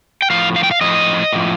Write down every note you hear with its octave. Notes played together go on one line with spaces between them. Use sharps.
G5
A2 F3 F5
F5
G5
F5
A2 F3 D#5
A2 F3